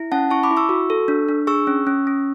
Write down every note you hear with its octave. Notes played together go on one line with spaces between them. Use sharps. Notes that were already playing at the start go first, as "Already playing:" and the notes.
Already playing: E4
C#4 F#5 A5
E4 A5 C#6
B5 D6
E4
C#6 E6
F#4
A4
D4
D4
G#4 C#6 E6
C#4
C#4
C#4